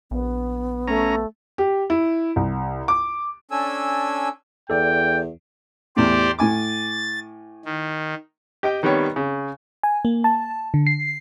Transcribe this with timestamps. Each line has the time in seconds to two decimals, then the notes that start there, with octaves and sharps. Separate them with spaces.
0.11 A#1 B3
0.88 A3 C#4 A#5
1.58 G4
1.90 E4
2.36 C2
2.88 D6
3.51 C#4 D4 A4 G#5 E6
4.70 E2 A4 D5 G5
5.97 E2 A2 G4 C5 D5
6.39 A2 G#5 D6 A6
7.65 D#3
8.63 G4 D#5 G5
8.83 D#3 G3 B3 G4 C#5
9.16 C#3
9.83 G#5
10.05 A#3
10.24 A5
10.74 D3
10.87 C7